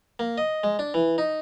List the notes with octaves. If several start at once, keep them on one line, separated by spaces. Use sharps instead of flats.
A#3
D#5
G#3
D4
E3
D#4